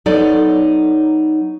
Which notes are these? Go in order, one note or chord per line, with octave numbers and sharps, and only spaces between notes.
F#3 B3 D#4 A4 C#5 D5